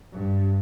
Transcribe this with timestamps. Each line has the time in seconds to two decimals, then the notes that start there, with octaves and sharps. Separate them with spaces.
0.12 G2